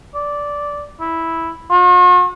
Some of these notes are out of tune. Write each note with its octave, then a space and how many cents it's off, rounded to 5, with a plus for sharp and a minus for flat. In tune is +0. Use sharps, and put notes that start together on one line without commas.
D5 -10
E4 -5
F#4 -45